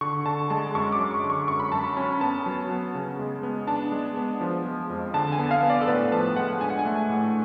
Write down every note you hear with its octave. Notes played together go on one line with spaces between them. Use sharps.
D3 C#6
D3 A5
G#3 A5
F#2 C#6
D6
F#2
C#6
D3
C#6
F#2 C#6
B5
F#2 A5
B5
C#4
B3 A5
F#3
B3
C#3
G#3
B3
D4 A5
G#3
B3
F3
G#3
F2
D3 A5
G#5
B3
F5
B3
D5
A4
A2 B4
F3 A5
G#3 F#5
D4 G#5
F#5
G#5
A3
A2